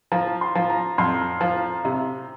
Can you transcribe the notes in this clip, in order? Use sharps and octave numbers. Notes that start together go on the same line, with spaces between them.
F3 A#5
C6
F3
A#5
F2 C6
F3
C3